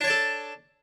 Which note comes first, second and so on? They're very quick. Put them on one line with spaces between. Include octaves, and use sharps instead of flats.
D4 C#5 D5 A4